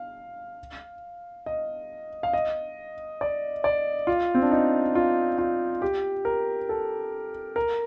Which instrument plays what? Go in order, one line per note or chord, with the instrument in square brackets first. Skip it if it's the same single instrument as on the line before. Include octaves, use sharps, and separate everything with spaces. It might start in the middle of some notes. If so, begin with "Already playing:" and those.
Already playing: [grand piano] F5
D#5
F5
D#5
D5
D5
F4
C4
D4
D#4
F4
F4
G4
A#4
A4
A#4